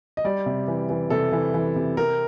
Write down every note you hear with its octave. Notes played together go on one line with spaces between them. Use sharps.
D#5
G3 D5
C3
E3
E3
C3 A4
E3
E3
C3
C4 A#4